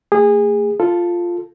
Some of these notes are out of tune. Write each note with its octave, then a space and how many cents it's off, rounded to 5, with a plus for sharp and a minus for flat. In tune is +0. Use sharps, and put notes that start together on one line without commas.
A3 +35 G#4 -25
F4 +0 A4 +0